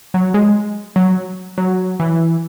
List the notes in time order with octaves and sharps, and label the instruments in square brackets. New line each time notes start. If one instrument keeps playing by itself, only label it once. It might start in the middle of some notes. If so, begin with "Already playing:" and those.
[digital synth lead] F#3
G#3
F#3
F#3
E3